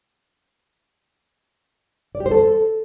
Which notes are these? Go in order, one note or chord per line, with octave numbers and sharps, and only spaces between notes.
D5
G4
C5
A4